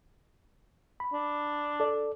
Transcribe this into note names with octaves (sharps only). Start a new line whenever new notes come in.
B5
D4
A4 D5